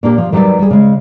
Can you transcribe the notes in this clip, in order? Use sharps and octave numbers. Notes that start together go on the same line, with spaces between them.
A#2 A#3 D4 G4
F3
D#3 F#3 G3 A#4 B4 D5
G3 G#4
C#3 G#3